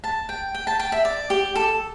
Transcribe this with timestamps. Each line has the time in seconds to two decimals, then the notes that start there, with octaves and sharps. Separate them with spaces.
0.04 A5
0.29 G5
0.54 G5
0.67 A5
0.80 G5
0.92 E5
1.05 D5
1.30 G4
1.55 A4